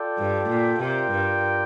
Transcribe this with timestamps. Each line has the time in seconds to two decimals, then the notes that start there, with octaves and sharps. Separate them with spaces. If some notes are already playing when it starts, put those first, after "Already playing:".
Already playing: F4 A4 D5 G5
0.18 G2
0.50 A#2
0.81 C3 F4 A#4 D5 G5
1.12 G2